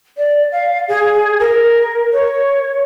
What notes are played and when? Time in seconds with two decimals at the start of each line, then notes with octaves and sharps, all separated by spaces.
0.17 D5
0.51 F5
0.88 G#4
1.39 A#4
2.12 C#5